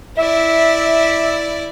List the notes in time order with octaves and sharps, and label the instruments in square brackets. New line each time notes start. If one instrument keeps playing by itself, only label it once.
[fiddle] E4 D5 [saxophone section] E5